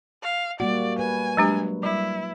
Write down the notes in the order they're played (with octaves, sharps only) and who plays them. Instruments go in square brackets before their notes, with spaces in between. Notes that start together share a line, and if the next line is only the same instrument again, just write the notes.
[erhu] F5
[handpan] G3 A#3 F#4 [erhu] D5 [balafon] F#5
[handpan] B4 [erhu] G#5
[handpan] F#3 [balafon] G#3 D4 G4
[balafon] G3 [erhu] E4